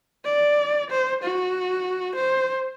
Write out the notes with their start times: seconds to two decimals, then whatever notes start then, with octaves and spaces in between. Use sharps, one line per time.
0.25 D5
0.90 C5
1.23 F#4
2.15 C5